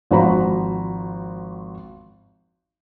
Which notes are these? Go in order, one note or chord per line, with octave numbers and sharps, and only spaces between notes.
G#1 F3 F#4 C5 A#5 B5